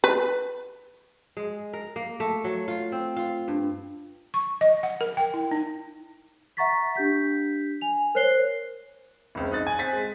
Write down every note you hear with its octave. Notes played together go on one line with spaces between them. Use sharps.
B4
G#3
A#4
A#3
A3
F#3
F4
C4
F4
G2
C#6
D#5
F#5
A#4
G5
E4
D#4
E5 F#5 A#5 C#6 A6 B6
D4 G4 G6 B6
G#5 F7
A#4 C5 C#5 F#6 C7 G7
F1 C#2 C4
F#2 D#4 F#6 A6
G#5
C4 A6 B6
G#3